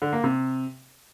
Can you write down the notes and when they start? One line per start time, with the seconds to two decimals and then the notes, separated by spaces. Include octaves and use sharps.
0.02 D3
0.13 A#3
0.24 C3